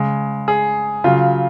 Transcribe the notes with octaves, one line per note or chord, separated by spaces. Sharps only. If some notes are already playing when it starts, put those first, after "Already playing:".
Already playing: C#3 G#3
G#4
C#3 F#3 F4